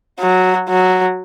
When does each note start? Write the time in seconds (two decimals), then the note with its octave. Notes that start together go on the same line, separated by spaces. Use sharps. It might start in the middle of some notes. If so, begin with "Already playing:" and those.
0.20 F#3
0.69 F#3